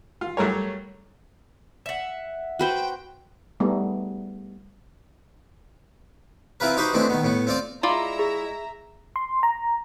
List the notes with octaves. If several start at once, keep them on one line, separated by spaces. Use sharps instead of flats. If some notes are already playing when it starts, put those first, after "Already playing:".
F4
F#3 G3 A3 A#4 C#5
E5 F#5
F#4 B4 C5 G5
G3 A3 B3 D#4 G#4
C4 E4 F4 A#4 B4
D#4 F#4 G4 B4 C5
E3 G#3 A3 C4 D4
D#3 B3
A2 B3
C4 F4 D5
G#3 E4 F4 D5 E5 A#5 B5
G#4
C6
A#5